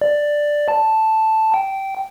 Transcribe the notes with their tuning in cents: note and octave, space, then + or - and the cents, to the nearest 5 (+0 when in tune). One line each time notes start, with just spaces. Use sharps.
D5 +5
A5 +0
G5 -15